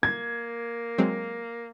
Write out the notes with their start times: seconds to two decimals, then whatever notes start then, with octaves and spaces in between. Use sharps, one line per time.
0.03 A#3 G#6
0.98 F#3 G#3 C4